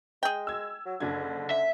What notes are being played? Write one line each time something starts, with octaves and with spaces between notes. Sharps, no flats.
G#3 G#4 G5
E6 G#6
F#3
F#1 D3 D4 G#6
E5